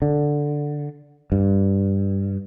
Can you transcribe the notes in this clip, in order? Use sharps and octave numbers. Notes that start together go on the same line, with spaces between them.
D3
G2